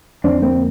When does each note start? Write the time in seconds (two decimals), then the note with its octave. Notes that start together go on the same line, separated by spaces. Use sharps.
0.24 F2 D3 C4 D4
0.42 A#3 C4